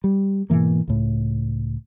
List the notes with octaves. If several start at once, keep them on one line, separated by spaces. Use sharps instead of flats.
G3
G#2 B2 E3 A#3
C#2 A2